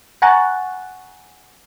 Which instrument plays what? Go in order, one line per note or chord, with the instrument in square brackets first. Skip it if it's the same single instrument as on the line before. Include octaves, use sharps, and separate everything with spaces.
[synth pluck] F#5 G#5 A#5 C#6 F#6 A6